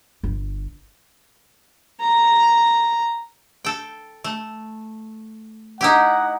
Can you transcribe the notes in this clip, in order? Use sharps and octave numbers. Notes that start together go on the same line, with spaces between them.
G1
A#5
A4 G5
A3
D#4 E4 G4 F#5